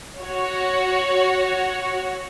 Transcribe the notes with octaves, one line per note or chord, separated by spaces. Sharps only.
F#4 C#5